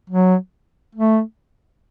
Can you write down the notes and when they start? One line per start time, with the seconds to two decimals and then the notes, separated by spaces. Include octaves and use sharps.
0.10 F#3
0.95 A3